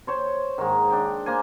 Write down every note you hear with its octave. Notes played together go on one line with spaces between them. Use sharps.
C5 C#5 C6
G#2 D#3
D4 G5
A#3 C5 G#5